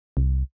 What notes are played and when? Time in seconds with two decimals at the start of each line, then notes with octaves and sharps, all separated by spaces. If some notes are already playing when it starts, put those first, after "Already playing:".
0.17 C2